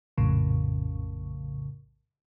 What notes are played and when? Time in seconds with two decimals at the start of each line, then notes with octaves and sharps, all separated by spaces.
0.18 A#1 F2 A2 C#3